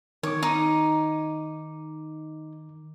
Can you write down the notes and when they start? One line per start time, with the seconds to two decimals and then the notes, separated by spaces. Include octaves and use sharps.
0.23 D#3 C#5 D6
0.42 D#4 D#6